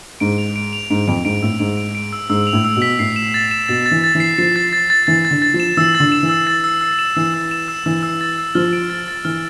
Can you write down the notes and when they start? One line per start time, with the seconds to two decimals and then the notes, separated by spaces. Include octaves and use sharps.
0.20 G#2 D7
0.38 F7
0.56 D7
0.73 F7
0.90 G#2 D7
1.08 F2 D7
1.25 G#2 D7
1.42 A2 E6
1.59 G#2 D7
1.77 D7
1.95 D7
2.13 E6
2.30 G#2 E6
2.47 F7
2.53 A2
2.65 E6
2.76 B2
2.82 B6
2.99 A2 C7
3.16 E7
3.34 A6
3.51 E7
3.68 B2 A6
3.86 A6
3.91 E3
4.04 A6
4.15 E3
4.20 C7
4.38 F3 C7
4.56 A6
4.73 A6
4.90 A6
5.07 E3 A6
5.25 A6
5.31 D3
5.42 A6
5.54 F3
5.60 E7
5.77 E3 E6
5.95 A6
6.00 D3
6.12 E7
6.23 E3
6.29 E6
6.47 A6
6.64 E6
6.81 E6
6.99 E7
7.16 E3 E6
7.34 E6
7.51 E7
7.68 E6
7.86 E3 E6
8.03 E6
8.21 A6
8.38 E6
8.55 F3 F6
8.73 D7
8.90 A6
9.08 A6
9.25 E3 F6